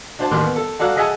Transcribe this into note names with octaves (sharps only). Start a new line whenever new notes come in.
D4 F#4 C5 D5 A5
A1 D#2 C6 D6 F6 F#6
B3
A4
F#4 A4 D5 F5 A#5 F#6
G#4 D#5 E5 F#5 G#5 A5